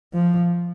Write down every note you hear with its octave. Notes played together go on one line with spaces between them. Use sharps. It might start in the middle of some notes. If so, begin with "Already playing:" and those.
F3